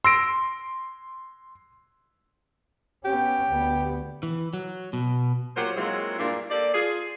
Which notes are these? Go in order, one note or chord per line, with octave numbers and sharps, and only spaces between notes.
C6 E6 A#6 D7
B3 C#4 G4
D2 B3
E3
F#3
B2
F#3 A#3 F4 G4 C5 F#5
F#3 G#3 A#3 C4 E4 F4
G2 A#2 A#3 D4 E4 D5
A#3 G4 A4 D5
F4 G#4